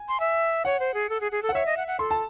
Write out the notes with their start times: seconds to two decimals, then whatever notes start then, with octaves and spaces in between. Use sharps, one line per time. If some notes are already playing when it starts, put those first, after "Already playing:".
Already playing: G#5
0.08 C6
0.20 E5
0.65 C#5 F#5
0.80 C5
0.94 G#4
1.09 A4
1.21 G#4
1.32 G#4
1.43 A4
1.49 F#5
1.54 C#5 E5
1.66 D#5
1.77 F#5
1.88 F#5
1.99 A4 C6
2.11 A5